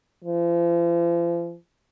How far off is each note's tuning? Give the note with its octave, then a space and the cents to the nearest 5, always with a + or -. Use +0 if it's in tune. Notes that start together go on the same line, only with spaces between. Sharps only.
F3 -40